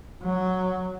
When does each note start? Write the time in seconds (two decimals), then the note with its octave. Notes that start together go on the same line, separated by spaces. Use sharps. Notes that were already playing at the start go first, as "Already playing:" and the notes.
0.22 F#3